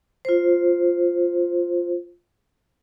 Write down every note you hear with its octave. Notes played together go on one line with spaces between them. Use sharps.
F4 C5